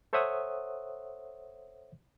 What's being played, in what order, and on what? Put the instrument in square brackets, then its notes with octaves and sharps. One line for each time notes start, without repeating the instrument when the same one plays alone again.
[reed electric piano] A4 C5 C#5 E5 F#5 D#6